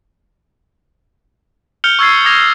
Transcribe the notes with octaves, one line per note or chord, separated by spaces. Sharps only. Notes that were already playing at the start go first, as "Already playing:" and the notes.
F6 G6 C#7 F7 G7
C#6 E6 G#6 A6 C7
D6 D#6 G#6 A#6 C#7 F7